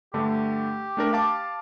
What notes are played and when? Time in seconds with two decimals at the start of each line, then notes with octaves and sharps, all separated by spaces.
0.14 G2 D3 A3 G4
0.97 A3 D4 A#4
1.13 F5 A5 D6